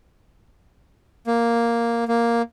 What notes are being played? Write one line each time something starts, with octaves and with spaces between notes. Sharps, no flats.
A#3
A#3